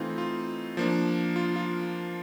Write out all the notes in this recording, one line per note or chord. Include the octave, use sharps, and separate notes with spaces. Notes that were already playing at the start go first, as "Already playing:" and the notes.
Already playing: E3 A3 C4 D#4 F4
F4
F3 A#3 D4
F4
F4